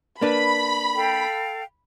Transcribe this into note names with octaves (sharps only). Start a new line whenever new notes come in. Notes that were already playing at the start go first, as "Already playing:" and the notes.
A#3 D4 B4 B5
A4 F5 G5